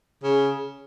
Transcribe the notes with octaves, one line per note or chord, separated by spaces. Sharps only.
C#3